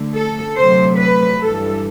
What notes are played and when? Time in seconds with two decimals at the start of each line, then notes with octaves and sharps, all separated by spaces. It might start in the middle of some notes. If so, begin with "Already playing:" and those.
Already playing: D2 D3 A3
0.14 A4
0.56 D2 C3 F#3 A3 C5
0.98 B4
1.40 G2 E3 G3 A4